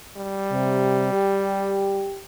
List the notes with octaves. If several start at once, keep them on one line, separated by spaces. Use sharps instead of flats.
G3
C3
G4